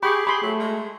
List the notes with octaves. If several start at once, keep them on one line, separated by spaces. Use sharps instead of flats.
G4 G#4 B5 C#6
G#4 B5 C6
F#3 A3
G#3